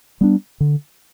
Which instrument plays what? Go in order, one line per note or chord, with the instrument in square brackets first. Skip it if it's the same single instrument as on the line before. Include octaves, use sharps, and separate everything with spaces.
[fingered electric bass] G3 B3 D4
D3